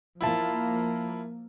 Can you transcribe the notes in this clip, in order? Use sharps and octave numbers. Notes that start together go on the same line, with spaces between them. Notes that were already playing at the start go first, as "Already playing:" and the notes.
F3 A#3 E4 F4 A5